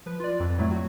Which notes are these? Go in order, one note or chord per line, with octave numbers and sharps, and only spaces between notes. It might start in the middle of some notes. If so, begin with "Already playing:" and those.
F3 B4
F4 D5
F2
A2 F#3 A3
F#4